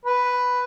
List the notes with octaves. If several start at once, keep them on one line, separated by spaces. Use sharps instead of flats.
B4